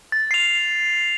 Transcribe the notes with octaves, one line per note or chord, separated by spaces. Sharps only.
A6
C7 F7